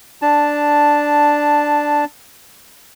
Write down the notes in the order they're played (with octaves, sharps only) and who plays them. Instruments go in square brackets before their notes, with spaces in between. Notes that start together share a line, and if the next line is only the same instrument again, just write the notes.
[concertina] D4 A5